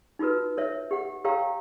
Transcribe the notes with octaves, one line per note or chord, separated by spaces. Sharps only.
D#4 F4 F#4 A#4 B4
A#4 C#5 E5
G4 F#5
G4 A#4 C#5 F5 G5 A#5